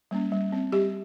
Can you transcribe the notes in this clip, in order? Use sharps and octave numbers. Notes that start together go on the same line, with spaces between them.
G3 A#3 C#4
G3
C4
G3 G4